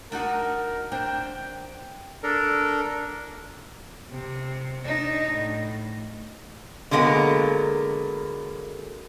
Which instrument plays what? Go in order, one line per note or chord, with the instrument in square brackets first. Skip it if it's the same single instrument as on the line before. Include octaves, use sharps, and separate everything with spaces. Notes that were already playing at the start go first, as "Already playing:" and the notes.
[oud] D4 D#4 F#4 [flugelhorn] A#4
[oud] C4 D4 [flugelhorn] G5
[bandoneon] D4 A4 A#4
[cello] C3
D4 D#4
A2
[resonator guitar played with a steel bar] D3 F#3 G#3 A#3 B3